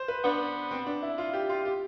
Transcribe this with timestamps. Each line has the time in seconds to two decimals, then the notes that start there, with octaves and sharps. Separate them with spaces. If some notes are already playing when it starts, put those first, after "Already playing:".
Already playing: C5
0.08 B4
0.24 B3 D4
0.71 C4
0.86 D4
1.02 E4
1.18 F4
1.33 G4
1.49 F4
1.65 G4